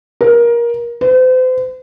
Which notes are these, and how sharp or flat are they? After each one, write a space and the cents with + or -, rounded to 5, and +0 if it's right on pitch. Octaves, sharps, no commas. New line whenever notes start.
A#4 +20
C5 -40